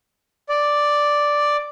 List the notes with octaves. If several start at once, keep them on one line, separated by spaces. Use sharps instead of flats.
D5